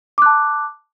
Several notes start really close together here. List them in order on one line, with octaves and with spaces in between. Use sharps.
D6 F#6 A5